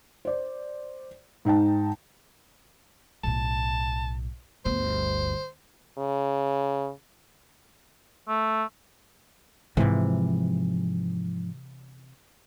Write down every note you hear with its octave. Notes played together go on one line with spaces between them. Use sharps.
C5 D5
G#2 D#4 G5 A5
B1 A2 A5
G1 D2 C5
C#3
A3
G#2 C3 E3 F3